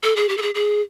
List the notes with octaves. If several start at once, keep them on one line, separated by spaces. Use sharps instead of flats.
A4
G#4
G4
A4
G#4
G#4